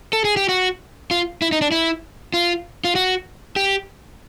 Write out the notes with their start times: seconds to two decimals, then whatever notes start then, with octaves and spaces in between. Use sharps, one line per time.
0.13 A4
0.25 G#4
0.37 G4
0.49 F#4
1.11 F4
1.42 E4
1.52 D#4
1.62 D4
1.72 E4
2.34 F4
2.84 F4
2.95 F#4
3.56 G4